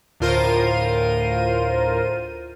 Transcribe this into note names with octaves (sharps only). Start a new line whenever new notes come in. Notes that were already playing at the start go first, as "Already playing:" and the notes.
D2 A2 F4 A#4 C5 D#7